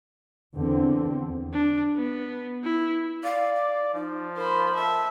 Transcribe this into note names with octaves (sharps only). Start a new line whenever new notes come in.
E2 D3 C4
D4
B3
E4
D5 F5
D6
F3 D#4
A#4 C5 B5
E5 A5